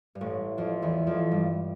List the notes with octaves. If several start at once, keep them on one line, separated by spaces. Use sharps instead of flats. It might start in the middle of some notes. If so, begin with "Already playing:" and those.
G2
A1 A2
F2 F3
E2 E3
F2 F3
G2 G3